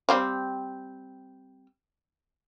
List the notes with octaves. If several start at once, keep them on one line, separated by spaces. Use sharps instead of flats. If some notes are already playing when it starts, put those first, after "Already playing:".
G3 C4 F5